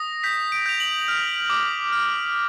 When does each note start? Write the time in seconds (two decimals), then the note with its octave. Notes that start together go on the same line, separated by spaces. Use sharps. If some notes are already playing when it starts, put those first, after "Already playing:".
Already playing: D#6 A#6
0.24 G6 B6
0.52 D7
0.66 G6 F7
0.80 F#7
1.08 F6
1.50 D6
1.92 F6